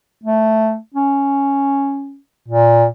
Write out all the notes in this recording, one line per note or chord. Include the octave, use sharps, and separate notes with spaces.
A3
C#4
A#2